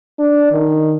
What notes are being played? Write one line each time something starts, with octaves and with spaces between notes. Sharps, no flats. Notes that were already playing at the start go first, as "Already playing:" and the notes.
D4
D#3